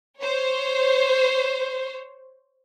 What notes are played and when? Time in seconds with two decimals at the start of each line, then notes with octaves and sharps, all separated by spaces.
0.20 C5 C#5